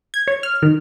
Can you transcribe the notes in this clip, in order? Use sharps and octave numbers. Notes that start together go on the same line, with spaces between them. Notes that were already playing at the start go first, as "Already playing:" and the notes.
G#6
C#5
F6
D#3